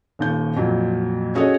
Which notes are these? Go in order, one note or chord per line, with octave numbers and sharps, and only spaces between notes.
D#1 D#2 G6
F2 A#2 F#3
C#4 F#4 G#4 A4 C#5 D#5